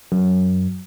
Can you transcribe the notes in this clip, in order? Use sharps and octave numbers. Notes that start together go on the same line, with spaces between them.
F#2